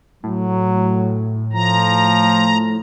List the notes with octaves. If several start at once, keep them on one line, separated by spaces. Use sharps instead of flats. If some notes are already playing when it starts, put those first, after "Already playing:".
A2 F#3
F3 A#5